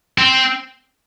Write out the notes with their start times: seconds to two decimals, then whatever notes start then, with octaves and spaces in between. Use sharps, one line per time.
0.18 C4